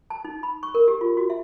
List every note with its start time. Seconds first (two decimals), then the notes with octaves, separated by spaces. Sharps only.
0.10 A5
0.25 D#4
0.43 B5
0.63 C#6
0.75 A#4
0.88 G4
1.01 F4
1.17 F#4
1.30 E5